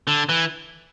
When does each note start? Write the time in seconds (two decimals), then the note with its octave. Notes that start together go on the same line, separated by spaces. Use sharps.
0.07 D3
0.29 E3